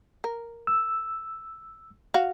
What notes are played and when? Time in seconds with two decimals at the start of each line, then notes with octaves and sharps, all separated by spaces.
0.24 A#4
0.67 E6
2.14 F#4 F5